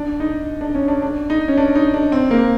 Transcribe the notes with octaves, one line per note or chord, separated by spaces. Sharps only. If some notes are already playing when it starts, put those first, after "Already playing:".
Already playing: D4
D#4
D4
C#4
D4
D4
D#4
C#4
D4
D#4
D4
C4
A#3